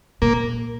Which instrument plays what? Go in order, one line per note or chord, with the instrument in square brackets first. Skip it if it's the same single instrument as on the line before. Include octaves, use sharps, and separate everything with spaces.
[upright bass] A#2 [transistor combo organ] A#3